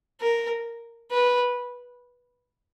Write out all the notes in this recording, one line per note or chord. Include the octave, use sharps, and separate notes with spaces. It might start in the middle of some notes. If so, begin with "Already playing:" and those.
A#4
B4